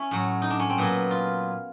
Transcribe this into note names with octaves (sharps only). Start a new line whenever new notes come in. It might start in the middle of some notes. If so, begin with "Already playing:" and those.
Already playing: C#4 E4
A2 F#3
D#4
D4
C#4
C4
A#2 F#3 B3
F4